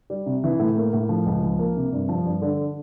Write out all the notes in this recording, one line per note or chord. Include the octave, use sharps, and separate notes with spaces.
G3
C3
E3
A2
A#3
A2
F3
C#2
F3
A#3
C3
G2
F3
G2
D3